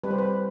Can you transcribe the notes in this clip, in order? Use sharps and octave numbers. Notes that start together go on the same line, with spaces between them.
G3 C4 G4 B4
C5
B4